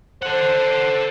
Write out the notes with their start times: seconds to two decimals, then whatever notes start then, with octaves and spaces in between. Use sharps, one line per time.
0.22 A4 C5 F#5